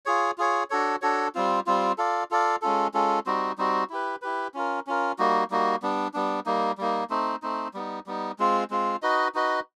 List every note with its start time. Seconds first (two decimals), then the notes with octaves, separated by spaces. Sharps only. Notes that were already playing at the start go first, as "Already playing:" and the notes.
0.06 F4 G#4 C#5
0.38 F4 G#4 C#5
0.70 D4 F#4 A4 C#5
1.02 D4 F#4 A4 C#5
1.35 G3 C4 F4
1.66 G3 C4 F4
1.98 F4 A4 D5 F5
2.31 F4 A4 D5 F5
2.62 G#3 C#4 F4 A4
2.94 G#3 C#4 F4 A4
3.26 G3 C4 D#4 F#4
3.58 G3 C4 D#4 F#4
3.90 E4 G4 B4
4.22 E4 G4 B4
4.54 C#4 F4 A#4
4.87 C#4 F4 A#4
5.18 G3 A#3 D#4 F#4
5.50 G3 A#3 D#4 F#4
5.82 G3 B3 D4
6.14 G3 B3 D4
6.46 G3 A#3 D#4
6.78 G3 A#3 D#4
7.10 A3 C4 D#4
7.42 A3 C4 D#4
7.74 G3 B3 D#4
8.06 G3 B3 D#4
8.39 G#3 C4 F4
8.70 G#3 C4 F4
9.02 D#4 F#4 B4 D#5
9.35 D#4 F#4 B4 D#5